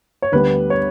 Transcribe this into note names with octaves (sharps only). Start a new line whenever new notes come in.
C#5
D2 D3 G3 B3 B4
C#5